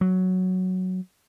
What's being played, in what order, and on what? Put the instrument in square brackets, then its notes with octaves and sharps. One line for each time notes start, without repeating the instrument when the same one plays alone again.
[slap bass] F#3